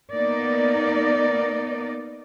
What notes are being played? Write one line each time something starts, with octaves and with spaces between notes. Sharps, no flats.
A#3 B3 D#4 A#4 D5